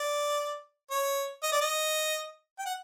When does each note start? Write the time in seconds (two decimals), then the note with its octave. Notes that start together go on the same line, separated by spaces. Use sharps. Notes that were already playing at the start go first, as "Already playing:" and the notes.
Already playing: D5
0.91 C#5
1.43 D#5
1.52 D5
1.61 D#5
2.59 G5
2.66 F#5